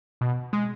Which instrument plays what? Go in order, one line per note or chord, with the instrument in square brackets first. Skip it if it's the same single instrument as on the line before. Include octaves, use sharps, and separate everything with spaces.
[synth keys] B2
G#3